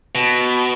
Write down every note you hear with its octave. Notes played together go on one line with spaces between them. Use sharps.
B2